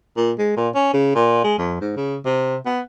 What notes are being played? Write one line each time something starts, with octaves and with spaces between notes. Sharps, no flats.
A#2
G#3
A#2
C#4
C#3
A#2
G#3
F2
G#2
C#3
C3
B3